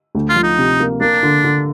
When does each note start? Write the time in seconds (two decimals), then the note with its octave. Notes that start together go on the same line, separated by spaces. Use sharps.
0.15 D2
0.29 F4
0.36 F3
0.43 D#4
0.58 C3
0.80 A#3
1.01 A#3 D4
1.23 D3
1.44 D3